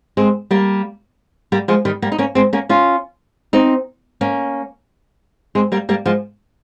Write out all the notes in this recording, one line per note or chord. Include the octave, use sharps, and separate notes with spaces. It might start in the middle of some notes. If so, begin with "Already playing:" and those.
G#3 C4
G3 A#3
G3 A#3
F3 G#3
D#3 G3
G3 A#3
D#4
A#3 C#4
G#3 C4
A#3 C#4
C#4 F4
C4 D#4
A#3 C#4
G#3 C4
G3 A#3
G3 A#3
F3 G#3